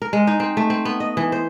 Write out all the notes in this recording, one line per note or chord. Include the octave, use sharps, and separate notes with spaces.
A#4
G#3
D#4
C4
A3
C4
B3
D#5
E3
C5